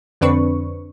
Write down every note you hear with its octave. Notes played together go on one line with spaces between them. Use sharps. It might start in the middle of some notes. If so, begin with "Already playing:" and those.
F2 D3 C4 D4 B4 C#6